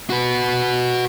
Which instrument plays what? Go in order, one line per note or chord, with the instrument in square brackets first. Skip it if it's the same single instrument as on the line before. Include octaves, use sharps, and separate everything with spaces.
[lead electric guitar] F#4 B4